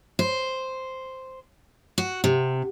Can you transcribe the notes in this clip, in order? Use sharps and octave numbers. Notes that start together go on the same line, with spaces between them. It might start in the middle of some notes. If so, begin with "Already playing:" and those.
C5
F#4
C3